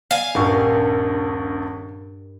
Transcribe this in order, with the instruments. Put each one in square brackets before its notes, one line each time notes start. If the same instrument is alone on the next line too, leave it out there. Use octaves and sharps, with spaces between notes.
[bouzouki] F5 G#5
[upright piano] D#1 A#1 C#6 [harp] G2 G4 A#4